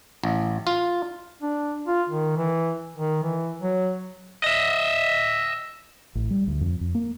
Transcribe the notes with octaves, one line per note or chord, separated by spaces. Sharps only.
A1
F4
D4
F4
D#3
E3
D#3
E3
F#3
D#5 E5
A1
G3
D2
F2
F2
A#3